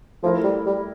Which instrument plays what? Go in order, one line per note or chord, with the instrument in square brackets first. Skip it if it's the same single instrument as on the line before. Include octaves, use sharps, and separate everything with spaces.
[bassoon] F3 [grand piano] A3 E4 A#4
[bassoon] G3
G3